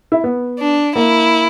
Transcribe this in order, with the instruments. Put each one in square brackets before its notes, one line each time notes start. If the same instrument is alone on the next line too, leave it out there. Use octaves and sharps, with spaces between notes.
[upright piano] E4
B3
[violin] D4
[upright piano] A#3 [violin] E4